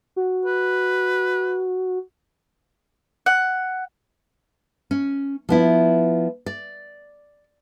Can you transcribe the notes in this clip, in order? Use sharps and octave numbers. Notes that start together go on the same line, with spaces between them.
F#4
B4
F#5
C#4
F3 B3 E4
D5